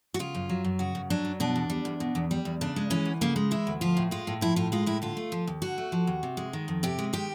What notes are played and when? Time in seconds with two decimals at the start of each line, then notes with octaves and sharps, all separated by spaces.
0.14 F#4
0.19 C#3 F4
0.35 F#2
0.49 F#3
0.64 F#2
0.79 C#3 F#4
0.95 F#2
1.10 F#3 D4
1.25 F#2
1.40 B2 D4
1.56 E2
1.70 G3
1.85 E2
2.00 B2
2.15 E2
2.31 G3
2.45 E2
2.61 C#3 D4
2.76 G#3
2.90 E3 C#4
3.05 D2
3.21 C#3 A#3
3.36 G#3
3.51 E3 E4
3.67 D2
3.81 F3 F4
3.97 A2
4.11 G#3 F4
4.27 A2
4.41 F3 E4
4.56 A2 F4
4.72 G#3 F4
4.86 A2 E4
5.02 D3 F4
5.17 A3
5.32 F3
5.47 D#2
5.62 D3 F#4
5.78 A3
5.92 F3
6.07 D#2
6.23 C3
6.37 G#3
6.53 D#3
6.68 F2
6.83 C3 G4
6.99 G#3
7.13 D#3 G4